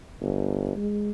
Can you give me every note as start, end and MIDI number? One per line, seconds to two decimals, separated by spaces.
0.21 0.75 31
0.76 1.11 56